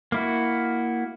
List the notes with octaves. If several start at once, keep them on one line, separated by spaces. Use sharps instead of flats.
A#3 E4 F#4